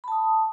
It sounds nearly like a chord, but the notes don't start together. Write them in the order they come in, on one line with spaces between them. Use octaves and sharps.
B5 A5 D#6